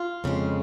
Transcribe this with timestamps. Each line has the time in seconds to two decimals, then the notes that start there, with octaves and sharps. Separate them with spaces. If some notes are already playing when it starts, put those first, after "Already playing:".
Already playing: F4
0.24 F2 C#3 G#3